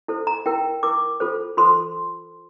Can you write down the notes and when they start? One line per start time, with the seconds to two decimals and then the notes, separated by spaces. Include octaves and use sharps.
0.08 E4 A4 C5
0.27 A#5
0.46 E4 A#4 G5
0.83 E4 A#4 D6
1.20 F4 A4 C5
1.57 F4 A4 C5 C6